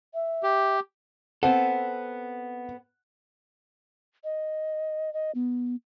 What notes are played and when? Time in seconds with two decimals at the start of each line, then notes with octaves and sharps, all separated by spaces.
0.14 E5
0.43 G4
1.43 B3 C4 A4 F#5
4.24 D#5
5.14 D#5
5.35 B3